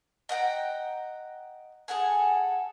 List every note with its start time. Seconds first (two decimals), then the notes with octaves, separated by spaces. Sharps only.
0.29 D#5 F#5 G5 A#5
1.88 G#4 A4 F#5 G#5